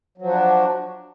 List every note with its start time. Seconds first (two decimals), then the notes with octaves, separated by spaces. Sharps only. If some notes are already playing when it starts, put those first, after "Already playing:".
0.18 F#3
0.22 F3
0.26 F#4
0.30 D4